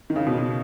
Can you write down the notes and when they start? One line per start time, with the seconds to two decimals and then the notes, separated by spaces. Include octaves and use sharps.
0.10 D#3
0.16 C#3
0.27 B2
0.38 B2